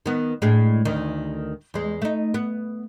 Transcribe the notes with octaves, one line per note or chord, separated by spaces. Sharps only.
D#3 B3
A2 G#3 D4
D2 D#3
E2 G#3
A3 D#4
B3